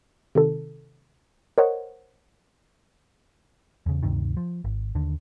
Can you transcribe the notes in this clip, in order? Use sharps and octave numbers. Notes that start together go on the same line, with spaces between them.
C3 D#3 A4
A#4 C5 C#5 D#5 F#5
E2 C#3
D2 G2 C3 D#3
F3
G#1
D#2 D3